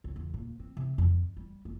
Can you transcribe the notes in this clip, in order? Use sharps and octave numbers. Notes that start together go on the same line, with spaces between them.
C#2
E2
A#2
C4
C3
F2
G3
F#1